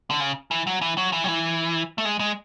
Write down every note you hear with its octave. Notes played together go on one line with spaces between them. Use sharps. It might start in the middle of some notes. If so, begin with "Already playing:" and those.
D3
C#3
E3
F#3
E3
F#3
E3
F#3
E3
A3
G#3
G#3